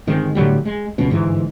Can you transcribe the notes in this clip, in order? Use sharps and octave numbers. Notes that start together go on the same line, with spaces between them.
G1 D#3 G#3 C4
A2 D3 F#3 G3
G#3
C#2 F#2 B2
G1 G#2 E3